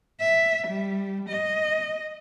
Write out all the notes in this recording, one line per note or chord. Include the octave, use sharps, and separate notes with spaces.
E5
G3
D#5